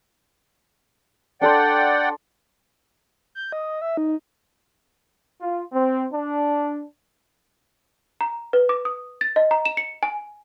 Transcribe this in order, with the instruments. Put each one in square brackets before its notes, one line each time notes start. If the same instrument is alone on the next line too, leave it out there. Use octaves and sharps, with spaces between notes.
[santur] D4 A4 C6 [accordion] D5 F#5 G5
[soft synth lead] G6
D#5
E5
D#4
[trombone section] F4
C4
D4
[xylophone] A#5
B4
D6
D#6
A6
D#5
A#5
E7
C#7
G#5